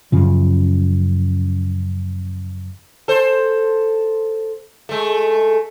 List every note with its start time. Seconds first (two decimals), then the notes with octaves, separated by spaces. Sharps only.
0.12 F#2 C#3 F3
3.08 A4 C5
4.89 G#3 A3